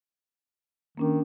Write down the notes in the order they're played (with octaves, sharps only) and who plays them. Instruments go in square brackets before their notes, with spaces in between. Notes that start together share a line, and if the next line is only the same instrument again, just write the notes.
[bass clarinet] D#3 [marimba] A#3 C#4 D4